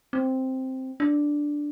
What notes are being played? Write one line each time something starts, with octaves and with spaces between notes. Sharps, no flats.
C4
D4